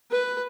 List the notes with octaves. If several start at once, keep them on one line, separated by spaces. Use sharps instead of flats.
B4